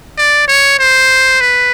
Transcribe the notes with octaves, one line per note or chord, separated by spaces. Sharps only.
D5
C#5
C5
B4